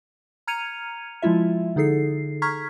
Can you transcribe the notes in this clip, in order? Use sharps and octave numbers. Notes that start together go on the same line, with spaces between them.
A#5 F6 G#6 C#7 D#7 F7
F3 G#3 E4 F4 E5
D3 D#4 G#4 A4 C7
A#5 C#6 F6 G#6 B6